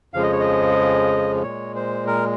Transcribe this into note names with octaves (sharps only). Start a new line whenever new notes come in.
F2 C#3 F3 G#3 F5
D#5
C#5
D#5
A#2 G#3 C#5
C5
A#4